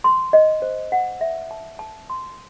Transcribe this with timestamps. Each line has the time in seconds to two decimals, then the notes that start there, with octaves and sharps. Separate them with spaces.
0.04 C6
0.33 D#5
0.62 C5
0.92 F#5
1.21 E5
1.51 A5
1.79 A5
2.10 C6